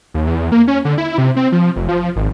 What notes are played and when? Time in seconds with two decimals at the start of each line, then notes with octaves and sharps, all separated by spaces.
0.14 D#2
0.27 E2
0.52 A#3
0.68 C#4
0.85 D3
0.98 E4
1.18 C3
1.36 C4
1.52 F3
1.76 F1
1.89 F3
2.16 G#1